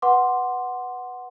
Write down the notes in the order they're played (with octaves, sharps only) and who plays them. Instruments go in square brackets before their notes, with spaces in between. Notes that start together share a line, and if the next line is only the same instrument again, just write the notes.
[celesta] B4 F#5 C6 D6